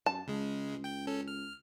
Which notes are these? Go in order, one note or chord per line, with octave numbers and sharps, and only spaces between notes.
F#2 A5
C#2 C#3 G#3
G5 G6
C#4 A4
F6